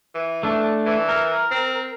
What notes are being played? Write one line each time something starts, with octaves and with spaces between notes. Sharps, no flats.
E3
A3 D4
E3
A#4
C4